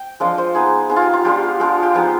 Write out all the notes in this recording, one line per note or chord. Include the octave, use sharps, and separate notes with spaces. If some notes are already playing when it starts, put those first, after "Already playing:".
Already playing: G5
F3 G#3 D4 F4 D#5
C5
B3 D#4 G#4
B3 D#4 G#4
F4
G4
F4
G#3 D4 F4 G4
G#3 D4 F4
G4
F3 B3 D#4 G#4